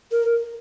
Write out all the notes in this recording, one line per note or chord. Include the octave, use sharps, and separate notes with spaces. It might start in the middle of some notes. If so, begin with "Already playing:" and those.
A#4